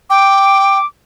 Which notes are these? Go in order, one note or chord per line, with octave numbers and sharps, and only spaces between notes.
G5 D6